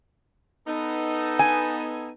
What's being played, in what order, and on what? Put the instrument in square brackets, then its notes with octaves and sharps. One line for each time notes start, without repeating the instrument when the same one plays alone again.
[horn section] B3 D#4 A4
[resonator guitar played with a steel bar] G#5